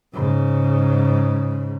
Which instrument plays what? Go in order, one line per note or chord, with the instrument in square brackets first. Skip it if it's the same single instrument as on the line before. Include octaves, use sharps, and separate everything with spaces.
[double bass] G#2 C#3